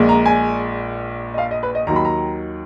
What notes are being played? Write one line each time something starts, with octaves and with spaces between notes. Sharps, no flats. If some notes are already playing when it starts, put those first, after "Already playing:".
Already playing: A#1 A#2 G#3
A#5
G#5
D#5
F5
D#5
B4
D#5
D#2 D#3 F#3 A#5
B5
A#5